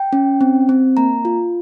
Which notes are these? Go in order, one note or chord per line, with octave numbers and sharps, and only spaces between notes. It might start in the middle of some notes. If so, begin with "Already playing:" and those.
Already playing: G5
C#4
C4
C4
A#3 A#5
F4